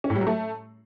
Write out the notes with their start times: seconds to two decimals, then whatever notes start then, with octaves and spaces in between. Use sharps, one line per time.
0.04 C#4
0.10 A2
0.15 G3
0.21 F#3
0.27 A3